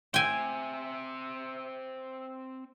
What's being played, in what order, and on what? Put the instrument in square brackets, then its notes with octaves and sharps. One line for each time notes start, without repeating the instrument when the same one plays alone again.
[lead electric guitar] C4 E5 [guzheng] G5 G#5